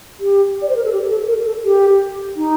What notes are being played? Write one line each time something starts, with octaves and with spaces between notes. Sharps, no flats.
G4
D5
C5
A#4
A4
G4
A4
A#4
A4
G4
D#4